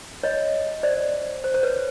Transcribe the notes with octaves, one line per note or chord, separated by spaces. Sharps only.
C#5 D#5
C5 D5
C5
C5
B4 C#5